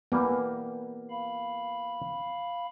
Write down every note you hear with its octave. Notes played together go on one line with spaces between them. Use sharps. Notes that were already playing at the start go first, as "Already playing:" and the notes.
E3 G3 A#3 B3
F5 B5